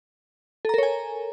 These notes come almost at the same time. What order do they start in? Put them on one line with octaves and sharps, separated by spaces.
A4 A#5 A#4 C#5 G#5